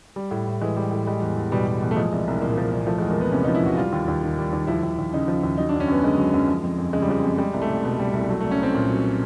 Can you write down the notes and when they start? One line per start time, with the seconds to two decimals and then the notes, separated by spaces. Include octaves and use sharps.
0.16 G3
0.31 A2
0.47 A2
0.62 E3 G#3
0.77 G3
0.92 A2
1.07 G3 G#3
1.21 E2
1.37 E2
1.52 B2 G3
1.67 G3
1.82 E2
1.91 A3
1.96 F3 G#3
2.12 C2
2.27 C2
2.42 A#2 A#3
2.57 F3
2.72 C2
2.87 F3 A3
2.98 G#3
3.02 E2
3.10 A#3
3.17 E2 B3
3.32 C3 C#4
3.44 D#4
3.48 F3
3.55 E4
3.63 E2 F#4
3.77 G3 F4
3.93 D#2
4.08 D#2
4.22 D#3
4.38 G3
4.53 D#2
4.67 F3 E4
4.83 D#2
4.99 D#2
5.13 C#3 D#4
5.28 F3
5.43 D#2
5.58 F#3 D#4
5.69 D4
5.73 F#2
5.80 C#4
5.88 F#2 B3
6.03 D3 G#3
6.18 F#3
6.34 F#2
6.48 F3
6.63 F2
6.78 F2
6.93 C#3 G#3
7.02 G3
7.08 F3 G#3
7.23 F2
7.38 G3 G#3
7.53 C2
7.62 A3
7.69 C2
7.84 B2
7.99 G3
8.13 C2
8.29 F#3 A3
8.41 A3
8.44 C2
8.51 C#4
8.59 C2 C4
8.74 A#2
8.89 F#3